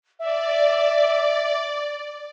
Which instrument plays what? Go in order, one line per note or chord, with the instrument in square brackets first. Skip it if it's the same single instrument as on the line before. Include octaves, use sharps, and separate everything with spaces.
[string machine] D5 [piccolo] E5